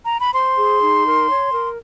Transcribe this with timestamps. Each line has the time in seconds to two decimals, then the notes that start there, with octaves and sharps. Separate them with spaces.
0.06 A#5
0.19 B5
0.33 C5 C6
0.57 G#4
0.80 D#4
1.05 A#4
1.29 C#5
1.52 A#4